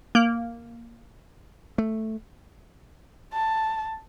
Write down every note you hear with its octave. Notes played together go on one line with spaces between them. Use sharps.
A#3
A3
A5